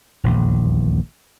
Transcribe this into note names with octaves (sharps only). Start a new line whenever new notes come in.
D#1 A#1 E2